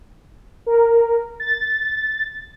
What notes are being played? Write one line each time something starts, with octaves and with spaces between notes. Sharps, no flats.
A#4
A6